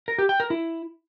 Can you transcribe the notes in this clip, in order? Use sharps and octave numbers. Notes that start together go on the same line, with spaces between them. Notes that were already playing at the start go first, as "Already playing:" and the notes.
A#4
G4
G5
A#4
E4